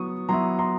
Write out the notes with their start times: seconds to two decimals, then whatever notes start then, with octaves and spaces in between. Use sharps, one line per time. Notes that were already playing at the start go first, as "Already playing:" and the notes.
Already playing: F#3 B3 C#6 D#6
0.29 F#3 B3 E4 A#5 C6
0.59 A#5 C6